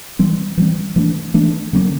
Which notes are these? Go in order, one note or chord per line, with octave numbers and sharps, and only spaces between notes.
E3 G3 C4
E3 G3 C4
E3 A3 D4
E3 A3 D4
D3 F#3 A#3 C#4